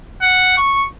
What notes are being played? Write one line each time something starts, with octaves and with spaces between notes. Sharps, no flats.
F#5
C#6